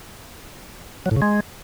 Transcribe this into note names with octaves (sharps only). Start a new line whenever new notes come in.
F#3
A2
C#3
G#3